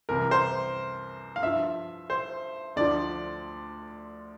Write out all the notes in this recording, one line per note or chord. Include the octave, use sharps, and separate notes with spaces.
C2 C3 E3 A#4
C5
F5
G2 F3 E5
C5
D2 D3 F3 D5